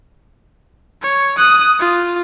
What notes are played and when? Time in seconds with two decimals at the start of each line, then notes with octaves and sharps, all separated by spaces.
1.02 C#5
1.38 D#6 F#6
1.80 F4